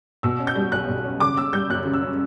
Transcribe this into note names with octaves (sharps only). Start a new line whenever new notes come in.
B2 E6
C#4
G6
G3
B1 F#6
B2
C#4
C#3 D6
C#4 E6
G3 G6
F#2 F#6
C#3
E6
C#4